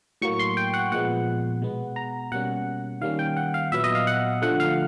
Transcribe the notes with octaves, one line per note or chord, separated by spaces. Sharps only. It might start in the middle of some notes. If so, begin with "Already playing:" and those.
A2 F#3 A#3 C#6
C6
G5
F#5
A#2 F3 G#3 B3 F#5
B2 G#3 B3
A#5
B2 G3 A#3 C#4 F#5
D#3 G3 A#3 C#4 F5
G5
F#5
F5
A#2 F#3 B3 E5
D#5
F5
F#5
D3 F3 A3 F#5
F5